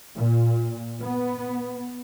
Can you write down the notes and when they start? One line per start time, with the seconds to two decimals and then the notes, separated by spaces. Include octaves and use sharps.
0.16 A#2
1.02 B3